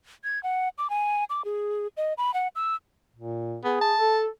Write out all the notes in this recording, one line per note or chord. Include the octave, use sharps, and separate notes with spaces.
G#6
F#5
D6
G#5
D6
G#4
D#5
B5
F#5
E6
A#2
B3 G#4
A5
A4